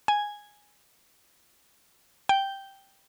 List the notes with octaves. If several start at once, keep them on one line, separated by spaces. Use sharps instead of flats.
G#5
G5